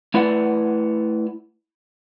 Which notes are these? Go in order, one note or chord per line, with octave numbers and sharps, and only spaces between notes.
A3 E4 B4 D5 F#5